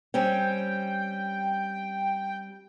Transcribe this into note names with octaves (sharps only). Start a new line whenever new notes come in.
G3 C4 C#4 G5